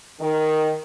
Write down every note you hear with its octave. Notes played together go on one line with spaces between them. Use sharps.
D#3